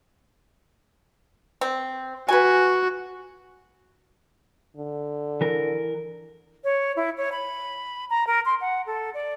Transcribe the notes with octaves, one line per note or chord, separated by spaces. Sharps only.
C4
F#4 B4 G#5
D3
E3 A#4
C#5
E4
C#5
B5
A#5
A#4
C6
F#5
A4
D5